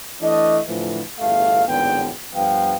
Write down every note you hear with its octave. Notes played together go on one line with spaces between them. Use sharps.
E3 A3 D4 D#5
A2 D3 E3 F3
G1 E2 A3 F5
G#1 E2 A2 D3 B3 G5
G2 F3 B3 F5 G5